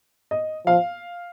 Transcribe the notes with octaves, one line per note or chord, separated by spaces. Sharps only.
D#5
F3 F5